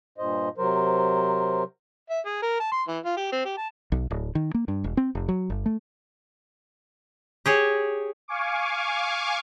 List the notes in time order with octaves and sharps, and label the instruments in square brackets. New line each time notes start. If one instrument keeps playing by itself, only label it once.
[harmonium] G2 A#2 C5 D#5
C3 F#3 A#4 C5
[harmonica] E5
G#4
A#4
A5
C6
E3
F4
G4
C4
G4
A5
[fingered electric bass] B1
D1
D#3
A#3
G2
E1
C4
F1
F#3
G1
A3
[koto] G4 G#4 C#5
[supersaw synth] F5 G#5 C#6 D6